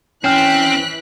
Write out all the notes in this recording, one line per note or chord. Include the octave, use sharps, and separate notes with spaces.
E3 C4 C#4 G5 F6 F#6 B6